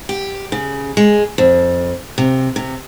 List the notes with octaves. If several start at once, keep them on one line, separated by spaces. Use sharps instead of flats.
G4
C#3
G#3
F2
C3
C3